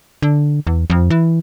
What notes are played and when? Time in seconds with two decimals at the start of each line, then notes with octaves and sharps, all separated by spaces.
0.22 D3
0.67 E2
0.90 F2
1.10 E3